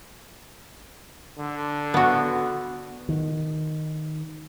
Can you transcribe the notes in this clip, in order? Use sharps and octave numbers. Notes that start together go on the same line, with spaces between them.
D3
B3 F#4
D#3